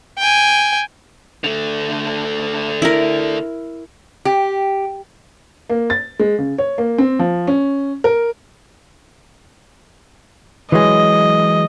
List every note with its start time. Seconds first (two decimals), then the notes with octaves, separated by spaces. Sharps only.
0.18 G5 G#5
1.44 D3 A3
2.82 E4 A#4
4.25 G4
5.69 A#3
5.90 A6
6.19 G#3
6.39 C#3
6.58 C#5
6.78 A#3
6.98 C4
7.19 F3
7.47 C#4
8.04 A#4
10.72 E3 F#3 G#3 D#5